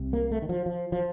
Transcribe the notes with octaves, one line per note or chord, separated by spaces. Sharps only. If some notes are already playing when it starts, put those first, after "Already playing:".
Already playing: C2 C3
A#3
A3
D#3
F3
F3
F3